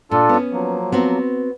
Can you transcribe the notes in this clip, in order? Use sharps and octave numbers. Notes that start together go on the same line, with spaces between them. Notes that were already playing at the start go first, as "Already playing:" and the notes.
A#2 D4 F4 A4
B3 C#4
F3 F#3 A#3
B3 C4 F#4